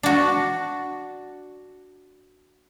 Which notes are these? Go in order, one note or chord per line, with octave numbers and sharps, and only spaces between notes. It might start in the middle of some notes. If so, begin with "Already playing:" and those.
D4 F#4